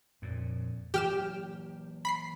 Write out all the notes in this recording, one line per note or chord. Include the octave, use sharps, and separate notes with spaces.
F2 A#2
E3 F#3 A#3 G4 F6 E7
B5 B6 C7